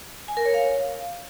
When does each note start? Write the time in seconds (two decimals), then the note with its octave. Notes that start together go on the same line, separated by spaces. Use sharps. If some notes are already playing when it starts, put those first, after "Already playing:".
0.28 G#5
0.37 A#4
0.45 C#5
0.54 F5